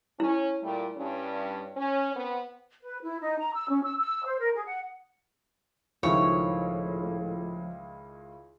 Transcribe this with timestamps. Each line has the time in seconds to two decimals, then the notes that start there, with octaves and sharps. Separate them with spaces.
0.20 C#4 E4 C#5
0.63 A#2 G3 A3
0.98 G2 C#4
1.77 C#4
2.15 B3 C4
2.81 B4
3.02 E4
3.20 D#4
3.38 A#5
3.53 E6
3.68 C#4
3.83 E6
3.98 E6
4.25 C5
4.40 A#4
4.54 G#4
4.66 F#5
6.03 C#2 A2 D#3 F3 E4 C#5